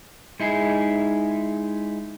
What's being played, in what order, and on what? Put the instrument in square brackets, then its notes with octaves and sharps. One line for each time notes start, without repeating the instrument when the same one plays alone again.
[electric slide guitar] G#3 D#4 E4 G#4